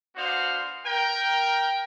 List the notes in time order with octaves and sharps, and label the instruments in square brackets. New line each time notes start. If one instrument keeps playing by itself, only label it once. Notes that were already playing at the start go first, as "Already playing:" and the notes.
[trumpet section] B3 D4 F#4 C5 F5
A#4 G5